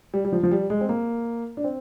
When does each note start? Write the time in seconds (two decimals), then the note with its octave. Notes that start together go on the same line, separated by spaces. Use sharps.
0.14 G3
0.25 G3
0.32 F3
0.43 F3
0.51 G3
0.70 G#3
0.81 C4
0.89 A#3
1.57 D4
1.64 C4